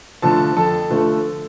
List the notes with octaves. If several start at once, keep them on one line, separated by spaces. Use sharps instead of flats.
D3 F3 A3 A4 A5
F2 A4 A5
D3 F3 A3